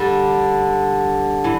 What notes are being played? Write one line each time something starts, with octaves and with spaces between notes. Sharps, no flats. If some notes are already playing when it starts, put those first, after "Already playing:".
Already playing: D3 G3
E3